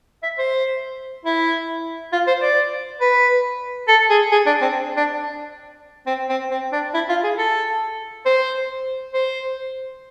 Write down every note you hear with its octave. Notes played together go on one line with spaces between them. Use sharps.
E5
C5
E4
F4
C5
D5
B4
A4
G#4
G#4
D4
C4
D4
C4
C4
C4
D4
E4
F4
G#4
A4
C5
C5